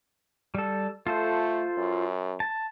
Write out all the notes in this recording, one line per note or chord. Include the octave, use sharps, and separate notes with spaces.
G3 A4
A3 F4 A4 C5
F#2
A5